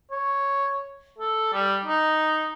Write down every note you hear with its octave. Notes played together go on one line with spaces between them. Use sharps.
C#5
A4
G3
D#4